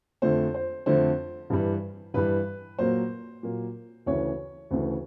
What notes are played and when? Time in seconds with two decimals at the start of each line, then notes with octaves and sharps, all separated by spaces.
0.22 F2 D3 F3 A3 C4 C5
0.54 C5
0.86 F2 D3 F3 A3 C4 C5
1.50 G2 E3 G3
2.14 G2 E3 G3 B4
2.78 A#2 F#3 A#3 C5
3.43 A#2 F#3 A#3
4.06 D2 C#3 E3 A3 C#5
4.71 D2 C#3 E3 A3